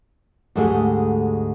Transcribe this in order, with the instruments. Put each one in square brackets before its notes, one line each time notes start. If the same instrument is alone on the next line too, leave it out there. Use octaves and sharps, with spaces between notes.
[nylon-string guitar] D2 G#2 G#3 A3 G4 G#4